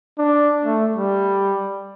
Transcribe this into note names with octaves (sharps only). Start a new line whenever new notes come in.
D4
A3
G3